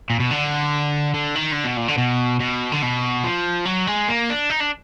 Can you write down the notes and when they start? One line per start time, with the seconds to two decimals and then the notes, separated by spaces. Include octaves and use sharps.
0.10 A#2
0.20 B2
0.31 D3
1.14 D3
1.36 D#3
1.52 D3
1.65 B2
1.77 A#2
1.88 D3
1.98 B2
2.40 B2
2.72 D3
2.82 B2
3.24 F3
3.65 F#3
3.87 G#3
4.08 A#3
4.30 D4
4.50 D#4
4.61 D4